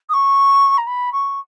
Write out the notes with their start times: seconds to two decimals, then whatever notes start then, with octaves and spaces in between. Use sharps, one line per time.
0.09 D#6
0.13 C#6
0.77 A#5
0.87 B5
1.12 C#6